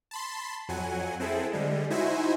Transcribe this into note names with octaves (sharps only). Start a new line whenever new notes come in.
A5 B5 C6
F2 F#3 F#5 G#5
C4 E4 G#4 A4
D3 G3 G#3
D#4 E4 F#4 C5 E5 G#5